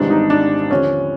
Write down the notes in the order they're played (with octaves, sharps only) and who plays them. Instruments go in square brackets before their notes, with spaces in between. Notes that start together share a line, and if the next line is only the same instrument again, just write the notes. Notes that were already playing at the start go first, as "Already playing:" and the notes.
Already playing: [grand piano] G#1 G#2 E3 G3 D4
D#4
D4
D#2 D3 F3 C#4